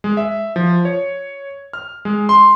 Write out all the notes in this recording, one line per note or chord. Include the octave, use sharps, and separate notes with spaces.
G#3
E5
F3
C#5
F6
G#3
C6